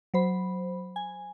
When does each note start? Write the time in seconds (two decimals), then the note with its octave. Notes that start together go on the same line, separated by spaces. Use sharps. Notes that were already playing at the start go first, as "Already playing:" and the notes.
0.14 F#3 C5 B5
0.96 G#5